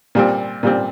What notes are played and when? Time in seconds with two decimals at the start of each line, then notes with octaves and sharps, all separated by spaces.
0.15 A#2 G3 C4
0.63 A#2 G3 C4